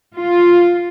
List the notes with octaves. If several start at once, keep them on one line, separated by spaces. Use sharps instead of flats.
F4